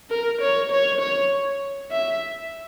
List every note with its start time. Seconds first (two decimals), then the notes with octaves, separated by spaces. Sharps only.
0.10 A#4
0.41 C#5
0.71 C#5
1.01 C#5
1.91 E5